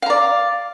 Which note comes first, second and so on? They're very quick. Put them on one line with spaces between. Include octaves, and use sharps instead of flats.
F5 A#5 D5